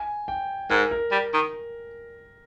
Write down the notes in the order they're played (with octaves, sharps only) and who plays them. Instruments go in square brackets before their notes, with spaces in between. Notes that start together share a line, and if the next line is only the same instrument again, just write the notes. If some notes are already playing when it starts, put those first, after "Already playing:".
Already playing: [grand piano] G#5
G5
[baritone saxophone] G#2 [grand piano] A#4
[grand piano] A#4
[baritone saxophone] G3
D#3